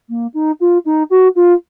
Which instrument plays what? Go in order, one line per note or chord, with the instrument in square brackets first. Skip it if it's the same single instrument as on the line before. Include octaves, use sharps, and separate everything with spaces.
[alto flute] A#3
D#4
F4
D#4
F#4
F4